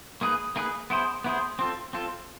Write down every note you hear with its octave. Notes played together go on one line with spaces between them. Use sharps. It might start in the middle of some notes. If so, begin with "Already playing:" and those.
A#3 D#4 G#4 B4
A#3 D#4 G#4 B4
B3 E4 G#4 C5
B3 E4 G#4 C5
C4 F4 A4
C4 F4 A4